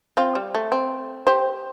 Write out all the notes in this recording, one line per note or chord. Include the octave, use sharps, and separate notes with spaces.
C4 F4
G3
A3
C4
G4 C5